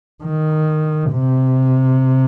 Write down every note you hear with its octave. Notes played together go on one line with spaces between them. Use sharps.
D#3
C3